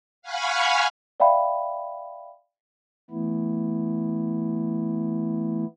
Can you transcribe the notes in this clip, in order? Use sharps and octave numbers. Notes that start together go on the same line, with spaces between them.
F5 F#5 G#5 B5 C#6 F6
D5 E5 F5 G5 B5
E3 A3 B3 E4